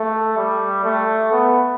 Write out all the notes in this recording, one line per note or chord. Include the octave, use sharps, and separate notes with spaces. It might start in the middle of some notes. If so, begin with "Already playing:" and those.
Already playing: A3
G3
A3
B3